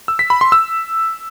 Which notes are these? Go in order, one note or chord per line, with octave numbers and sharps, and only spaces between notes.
E6
B6
B5
C6
E6